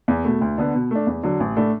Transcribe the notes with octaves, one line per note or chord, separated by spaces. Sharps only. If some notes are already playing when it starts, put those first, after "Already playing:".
E2
B2 A3
D2
D3 B3
B2
A3 D4
E2
D3 F#3
A1
A2 A3 D4